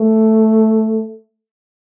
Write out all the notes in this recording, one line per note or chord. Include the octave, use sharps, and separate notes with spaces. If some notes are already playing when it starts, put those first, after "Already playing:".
Already playing: A3